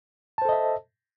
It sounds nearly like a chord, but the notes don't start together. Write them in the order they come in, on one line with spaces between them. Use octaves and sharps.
A5 C5 A4 D#5 E5